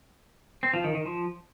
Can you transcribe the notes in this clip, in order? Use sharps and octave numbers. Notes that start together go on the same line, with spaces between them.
C4
F3
D#3
D#3
F3